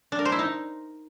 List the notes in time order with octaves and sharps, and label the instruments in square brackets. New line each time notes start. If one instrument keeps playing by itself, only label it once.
[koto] D4
A#4
C5
E4
D#4